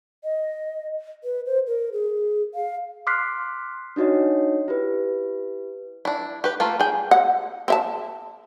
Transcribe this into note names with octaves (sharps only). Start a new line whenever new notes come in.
D#5
B4
C5
A#4
G#4
F5
C6 D6 F6 F#6 B6 C7
D4 D#4 F#4 C#5 D#5
E4 G4 B4
D4 E4
G4 B4
A3 A#3 F4
G#4 G5
F#5
C4 E5 A5